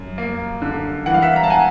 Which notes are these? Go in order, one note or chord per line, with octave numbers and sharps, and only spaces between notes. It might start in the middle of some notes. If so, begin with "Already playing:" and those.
Already playing: F#2
A#3
D3
E3 F#5
F5
E5 F#5
A#5
A5
F#5 G#5